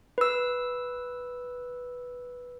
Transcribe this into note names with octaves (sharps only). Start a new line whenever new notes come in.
B4 E6